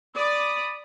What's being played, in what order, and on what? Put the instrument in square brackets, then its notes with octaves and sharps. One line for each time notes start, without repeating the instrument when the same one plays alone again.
[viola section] D5 [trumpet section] B5 D#6